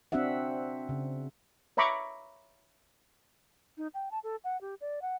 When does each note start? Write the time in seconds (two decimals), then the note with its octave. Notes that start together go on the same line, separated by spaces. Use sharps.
0.12 C4 D4 F#4 E5 F#5
0.89 C#3
1.77 C#5 E5 A#5 B5 C#6 D6
3.78 D#4
3.94 G5
4.11 A5
4.24 A4
4.44 F#5
4.61 G4
4.81 D5
5.02 F#5